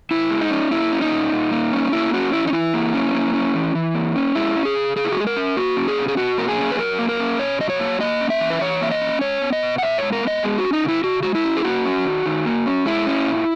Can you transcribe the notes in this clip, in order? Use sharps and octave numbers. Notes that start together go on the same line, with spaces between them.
C#3 E4
G#3
D#4
C#4
A#3 E4
C#4
D#4
A#2
A#2
A#3
C#4
A#3 E4
C#4 F#4
E3 E4
D#4
E3 E4
A#3
C#4
A#3
C#4
E3
E3
A#3
C#4
G#3 E4
C#4
G#4
C#3
C#3 G#4
E4
F#4
G#3 G#4
A#4
C#4
A#3 F#4
C#4
G#4
B2
G#4
B2 F#4
A#3 A#4
G#4
C#4
B4
F#3 A#4
A#3
A#4
C#4
B2 C#5
F#3 D#5
C#5
A#3
A#3 D#5
C#4
E5
E3
B4
E3 C#5
A#3 E5
D#5
C#4
G#3 C#5
B3
D#5
B2
F#5
B2 E5
G#3 C#5
A#4
B3 D#5
G#3 G#4
F#4
C#4
D#4
C#3 E4
C#3 F#4
G#3 F#4
E4
C#4
G#4
A#3 F#4
C#4
D#3
D#3
A#3
C#4
G#3 E4
C#4
A#2